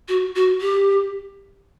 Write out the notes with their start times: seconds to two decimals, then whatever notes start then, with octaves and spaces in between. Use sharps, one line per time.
0.09 F#4
0.36 F#4
0.61 G4